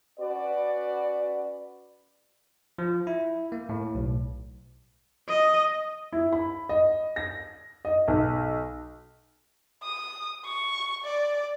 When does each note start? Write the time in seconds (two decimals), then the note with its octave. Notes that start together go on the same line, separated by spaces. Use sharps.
0.19 C#4 F#4 B4 D5
2.78 F3
3.07 E4
3.52 A#3
3.69 A2
3.95 B1
5.29 D#5
6.13 E4
6.33 B5
6.69 D#5
7.16 A#6
7.85 D#5
8.08 B1
9.83 D#6
10.45 C#6
11.04 D5